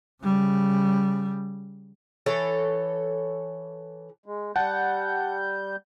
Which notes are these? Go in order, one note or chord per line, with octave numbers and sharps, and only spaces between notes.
C#3 G3
E3 A4 C#5
G#3
G3 F#5 A5 G6